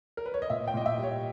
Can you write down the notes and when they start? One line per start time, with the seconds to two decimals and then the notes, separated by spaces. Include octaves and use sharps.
0.17 A#4
0.26 B4
0.34 C#5
0.42 D#5
0.50 A#2 E5
0.68 G5
0.74 A#2 D#5
0.86 E5
0.98 G3
1.03 C#5